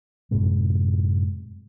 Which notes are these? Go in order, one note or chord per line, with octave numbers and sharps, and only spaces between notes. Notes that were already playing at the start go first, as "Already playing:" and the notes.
F#2 A2 C3 G#3